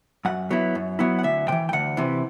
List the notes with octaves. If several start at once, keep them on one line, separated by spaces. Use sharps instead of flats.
F#2 F#5
F#3 B3 E4
F#2
F#3 B3 E4
F#5
D2 E5
C3 E3 G5
G5
D2 F#5
C3 E3